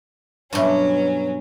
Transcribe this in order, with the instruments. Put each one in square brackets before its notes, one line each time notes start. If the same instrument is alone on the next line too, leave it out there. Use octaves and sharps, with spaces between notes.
[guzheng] G2 B2 [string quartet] F#3 C#4